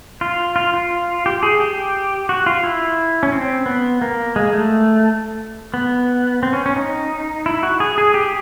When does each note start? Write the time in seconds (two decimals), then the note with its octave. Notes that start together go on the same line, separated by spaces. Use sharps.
0.21 F4
0.56 F4
0.74 F4
1.26 G4
1.43 G#4
1.60 G4
2.29 F#4
2.46 F4
2.64 E4
3.23 C#4
3.32 C4
3.66 B3
4.02 A#3
4.36 G#3
4.53 A3
5.74 B3
6.43 C4
6.53 C#4
6.66 C#4
6.76 D#4
7.46 E4
7.63 F#4
7.80 G#4
7.98 G#4
8.14 G4